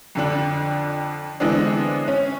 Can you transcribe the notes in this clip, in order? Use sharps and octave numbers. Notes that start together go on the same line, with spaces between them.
F2 D3 D4
D3 E3 G#3 B3 C4 D4
C#4